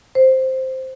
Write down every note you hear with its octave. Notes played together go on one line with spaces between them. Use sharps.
C5